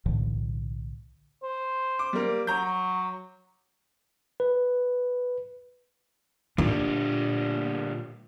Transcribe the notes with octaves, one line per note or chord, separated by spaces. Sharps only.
B1 A2 D3 E3
C5
D6
G3 A#3
F#3 A#5 G6
B4
D2 A#2 G3 D4